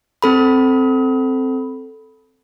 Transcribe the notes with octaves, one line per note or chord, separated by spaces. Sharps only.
C4 A4 B5